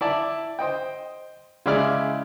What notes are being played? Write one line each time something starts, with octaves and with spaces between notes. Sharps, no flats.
E4 D5 A5
C5 D#5 G5
C#3 G#3 E4 D5 F6